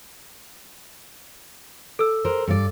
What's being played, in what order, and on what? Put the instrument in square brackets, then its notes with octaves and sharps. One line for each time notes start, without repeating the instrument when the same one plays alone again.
[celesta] A4 E6
[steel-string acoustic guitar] A#4 C5
G2 D5